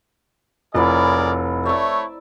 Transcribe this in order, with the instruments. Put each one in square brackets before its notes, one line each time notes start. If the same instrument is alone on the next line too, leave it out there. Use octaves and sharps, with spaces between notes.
[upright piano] F1 [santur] D#4 E4 C#5 [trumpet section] G#4 A#4 D5
[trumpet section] A3 E4 C#5 [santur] D5 E5